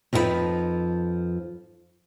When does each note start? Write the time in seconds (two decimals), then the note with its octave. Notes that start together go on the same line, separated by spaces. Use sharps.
0.13 F2 F3 D#4 G4 B4